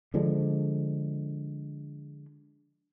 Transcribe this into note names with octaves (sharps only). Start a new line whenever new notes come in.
D3 F3 G#3 D4